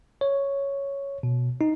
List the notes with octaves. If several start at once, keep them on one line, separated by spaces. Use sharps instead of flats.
C#5
B2
D#4